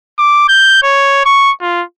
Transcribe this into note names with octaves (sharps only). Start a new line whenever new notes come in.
D6
G6
C#5
C#6
F4